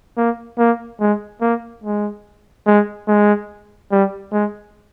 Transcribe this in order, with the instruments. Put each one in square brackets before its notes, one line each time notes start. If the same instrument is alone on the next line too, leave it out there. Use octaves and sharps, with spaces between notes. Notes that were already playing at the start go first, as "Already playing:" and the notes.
[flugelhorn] A#3
A#3
G#3
A#3
G#3
G#3
G#3
G3
G#3